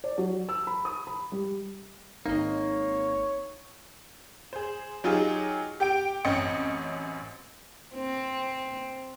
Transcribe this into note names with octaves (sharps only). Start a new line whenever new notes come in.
D5
F#3
E6
B5
D#6
B5
G3
G#1 A#3 C4 D#4 C#5 D#5
G#4 C5
F#3 D#4 F4 G4 G#4
G4 G5 D7
A1 F#2 C4 C#4 D#5 C#7
C4